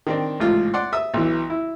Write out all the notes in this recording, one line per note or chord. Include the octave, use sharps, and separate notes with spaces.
D#3 C4 D4
A1 G#2 F4
D5 F#5 C6
E5 D#6 E6
B1 E3
E4